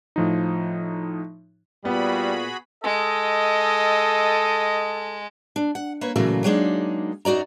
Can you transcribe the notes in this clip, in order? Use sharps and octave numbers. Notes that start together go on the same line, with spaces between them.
A2 F3 D#4
A#2 G3 B3 F#4 G#4 B5
G#3 A4 D#5
D4
F#5
A#3 B4 C#5
A#2 C#3 E3 F#3 A3 A#3
F#3 G#3 A#3 D4 D#4
F#2 D#4 F#4 D5 A#5